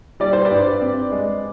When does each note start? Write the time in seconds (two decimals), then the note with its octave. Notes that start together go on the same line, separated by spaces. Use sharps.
0.20 G3 D5
0.33 C5
0.45 B4 D5
0.50 G2
0.81 C4
1.11 G#3